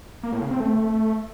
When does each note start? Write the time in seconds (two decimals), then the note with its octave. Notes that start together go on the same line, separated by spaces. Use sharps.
0.23 A#3
0.32 A2
0.42 C#3
0.51 C4
0.60 A3